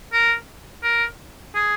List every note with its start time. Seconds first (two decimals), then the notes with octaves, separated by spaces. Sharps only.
0.13 A#4
0.83 A#4
1.55 G#4